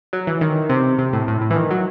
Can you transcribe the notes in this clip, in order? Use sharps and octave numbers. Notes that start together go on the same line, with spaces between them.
F#3
E3
D#3
C3
C3
A2
A2
A2
E3
D#3
F#3